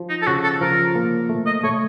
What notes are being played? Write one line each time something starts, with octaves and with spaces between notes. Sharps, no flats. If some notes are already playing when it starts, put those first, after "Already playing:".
Already playing: F3
D#4
A4
C#3 F#4
A4
F3 A#4
A#3
A3
D#5
A3 C#5